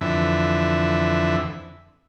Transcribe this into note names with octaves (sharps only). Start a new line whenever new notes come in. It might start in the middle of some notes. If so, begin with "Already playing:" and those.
F2 D3 E3 E5